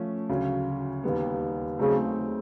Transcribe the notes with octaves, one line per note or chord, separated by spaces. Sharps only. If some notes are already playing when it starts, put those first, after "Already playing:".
Already playing: F3 A3 C#4
D2 C#3 F#3
D#2 D#3 G3 B3
C#3 F#3 A3 C4 D#4 G#4